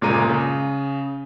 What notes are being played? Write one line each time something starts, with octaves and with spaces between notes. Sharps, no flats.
G1 A#2 C#3 G#3 A#5 D#7
C#3